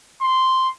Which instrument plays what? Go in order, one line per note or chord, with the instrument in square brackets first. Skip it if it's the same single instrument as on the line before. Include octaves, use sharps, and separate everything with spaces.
[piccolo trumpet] C6